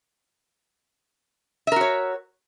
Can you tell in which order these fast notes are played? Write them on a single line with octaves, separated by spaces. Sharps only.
E5 A#4 F#4 C#5